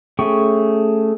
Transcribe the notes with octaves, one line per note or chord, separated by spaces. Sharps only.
A3 C#4 G#4 G5 C#6